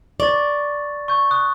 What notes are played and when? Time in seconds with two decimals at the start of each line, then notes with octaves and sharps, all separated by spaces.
0.20 D5 C#6 A6
1.08 C#6 G6
1.31 C#6 D#6 F#6